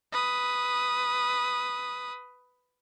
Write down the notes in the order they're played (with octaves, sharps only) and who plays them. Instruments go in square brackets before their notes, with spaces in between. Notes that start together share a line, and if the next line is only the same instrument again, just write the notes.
[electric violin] B4 D#6